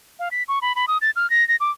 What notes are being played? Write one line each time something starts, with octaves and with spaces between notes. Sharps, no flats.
F5
B6
C#6
B5
B5
D#6
A6
F6
A#6
A#6
D6